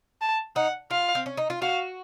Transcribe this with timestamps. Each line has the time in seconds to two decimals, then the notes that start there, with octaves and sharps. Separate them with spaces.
0.21 A5
0.56 D#4 F#5
0.91 F4 F5
1.15 C4
1.26 C#4
1.37 D#4
1.50 F4
1.62 F#4 F5